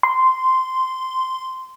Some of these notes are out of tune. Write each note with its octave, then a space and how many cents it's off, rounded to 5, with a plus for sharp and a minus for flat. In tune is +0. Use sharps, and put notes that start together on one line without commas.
C6 -10